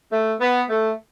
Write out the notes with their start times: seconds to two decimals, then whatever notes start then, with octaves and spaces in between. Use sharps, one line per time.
0.12 A3
0.40 B3
0.69 A3